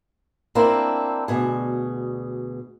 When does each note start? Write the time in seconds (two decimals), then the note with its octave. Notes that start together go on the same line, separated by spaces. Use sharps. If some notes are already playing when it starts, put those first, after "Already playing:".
0.55 A#3 C4 D4 E4
1.28 D2 B2 G#4